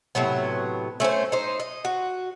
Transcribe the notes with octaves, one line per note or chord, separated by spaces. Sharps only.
A2 C3 F#3 B3
A3 C#4 F4 C5
D#4 C5
D#5
F#4